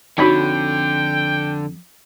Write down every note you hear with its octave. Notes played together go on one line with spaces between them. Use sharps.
F2 D3 D#4 F#4 C#5 G5 B5